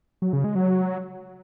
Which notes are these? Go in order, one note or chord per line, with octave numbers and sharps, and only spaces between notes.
F#3
C#3
G#3
F#3